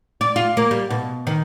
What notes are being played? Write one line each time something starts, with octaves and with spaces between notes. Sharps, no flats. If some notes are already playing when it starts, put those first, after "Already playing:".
D5
F4
A#3
G3
B2
D#3